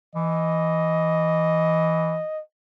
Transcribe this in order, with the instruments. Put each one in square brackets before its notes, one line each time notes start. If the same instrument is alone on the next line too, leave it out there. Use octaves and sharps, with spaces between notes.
[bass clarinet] E3 [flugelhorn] D#5